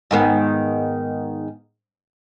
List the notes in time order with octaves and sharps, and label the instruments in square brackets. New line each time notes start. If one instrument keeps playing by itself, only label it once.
[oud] G#2 D#3 B3